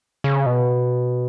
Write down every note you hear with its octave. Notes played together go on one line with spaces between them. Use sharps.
C#3
B2